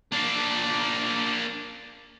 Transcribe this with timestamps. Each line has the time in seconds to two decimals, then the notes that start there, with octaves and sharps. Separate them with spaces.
0.12 A#3 D4